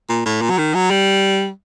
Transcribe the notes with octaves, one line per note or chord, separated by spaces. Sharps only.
A#2
A2
A#2
F#3
D#3
F#3
G3